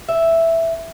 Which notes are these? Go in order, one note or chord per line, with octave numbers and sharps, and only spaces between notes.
E5